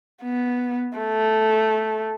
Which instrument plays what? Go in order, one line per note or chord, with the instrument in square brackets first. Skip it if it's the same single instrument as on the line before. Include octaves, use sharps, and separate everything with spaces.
[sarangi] B3
A3